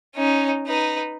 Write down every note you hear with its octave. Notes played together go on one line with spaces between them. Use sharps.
C#4 D#4
D#4 B4